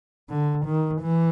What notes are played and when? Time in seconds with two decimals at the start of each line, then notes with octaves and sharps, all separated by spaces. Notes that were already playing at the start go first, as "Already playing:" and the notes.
0.30 D3
0.66 D#3
1.02 E3